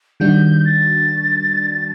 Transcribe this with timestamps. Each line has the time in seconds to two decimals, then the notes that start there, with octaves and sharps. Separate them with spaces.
0.20 D#3 G3 D4 F#4 G6
0.65 A6